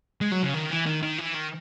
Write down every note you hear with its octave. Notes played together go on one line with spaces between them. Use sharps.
G#3
F#3
C#3
D#3
E3
D#3
D#3
E3
D#3